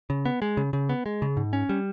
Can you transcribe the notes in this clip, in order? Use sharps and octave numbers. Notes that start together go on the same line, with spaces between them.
C#3
B3
G#3
C#3
C#3
B3
G#3
C#3
G#2
C#4
G3